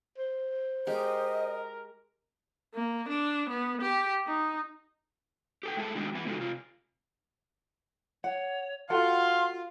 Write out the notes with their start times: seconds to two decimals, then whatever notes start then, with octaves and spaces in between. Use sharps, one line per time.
0.18 C5
0.87 G#3 G4 A#4 D#5
2.74 A#3
3.09 D4
3.50 B3
3.82 G4
4.27 D#4
5.63 G4 A4 G5
5.77 G#3 E4 A4
5.95 D#3 G3 G#3 D4 F#4 G4
6.15 E3 B3 E4
6.26 C#3 G#3 D#4 F4 F#4 A4
6.38 C3 F4
8.24 C#5 F#5
8.90 F4 F#4 A4 F5 F#5 C6